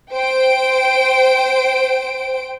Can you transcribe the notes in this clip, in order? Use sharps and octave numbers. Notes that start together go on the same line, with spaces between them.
C5 G5 D7